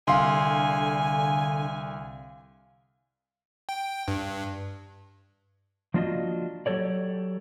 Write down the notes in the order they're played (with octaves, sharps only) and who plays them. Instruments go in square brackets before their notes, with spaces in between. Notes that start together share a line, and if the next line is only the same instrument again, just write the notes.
[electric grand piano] C2 [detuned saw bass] D3 [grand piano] F5 C6 [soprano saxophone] G#5
[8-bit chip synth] G5
G2
[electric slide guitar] F3 A#3 D4 F4 F#4 D#5
F#3 G4 A4 C#5 D5